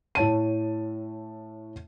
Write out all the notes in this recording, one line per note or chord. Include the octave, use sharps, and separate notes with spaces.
A2 C#5 A5 D#7